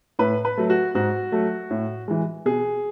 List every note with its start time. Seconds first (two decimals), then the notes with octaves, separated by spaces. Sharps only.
0.19 A2 B4
0.45 B4
0.57 F#3 A3
0.70 F#4
0.95 G#2 F#4
1.32 F#3 A3
1.70 A2
2.08 E3 G#3
2.45 B2 G#4